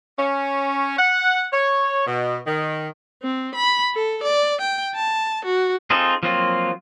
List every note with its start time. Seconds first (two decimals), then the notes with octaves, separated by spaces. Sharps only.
0.19 C#4
0.99 F#5
1.53 C#5
2.07 B2
2.47 D#3
3.22 C4
3.55 B5
3.94 A4
4.23 D5
4.61 G5
4.95 A5
5.45 F#4
5.90 C4 D#4 F4 G#4 A4
6.23 F3 F#3 A#3 C4 F4